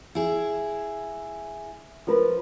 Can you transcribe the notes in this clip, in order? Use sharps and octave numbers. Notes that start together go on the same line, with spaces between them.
E4 G#4
F3 A#4 B4